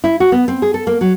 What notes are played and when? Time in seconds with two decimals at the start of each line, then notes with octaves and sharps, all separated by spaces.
0.04 E4
0.20 F#4
0.32 B3
0.48 C4
0.62 G#4
0.74 A4
0.87 A#3
1.01 F#3